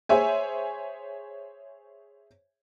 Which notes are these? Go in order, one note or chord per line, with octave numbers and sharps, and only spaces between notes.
G#4 C5 C#5 E5 G#5